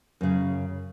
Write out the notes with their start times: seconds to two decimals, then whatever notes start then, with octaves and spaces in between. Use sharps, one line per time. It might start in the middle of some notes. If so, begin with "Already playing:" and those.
0.21 F#2 C#3